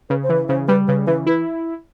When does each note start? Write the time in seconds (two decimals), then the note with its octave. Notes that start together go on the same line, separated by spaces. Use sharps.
0.10 C#3 B4
0.23 C5
0.29 E3 B4
0.48 C#3 C5
0.68 G3 B4
0.87 C#3 B4
1.07 E3 B4
1.26 E4 B4